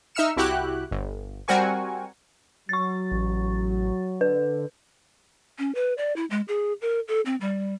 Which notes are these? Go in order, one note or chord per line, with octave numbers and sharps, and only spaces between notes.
D#4 E5 E6 F6 C#7 E7
C2 E4 F#4 G4 F#6
G1
G3 C4 F#4 A#4 G#5 C#6
F#3 C#6 A6
A1
D3 B4
C#4
B4
D5
E4
G#3
G#4
A#4
A4
C4
G3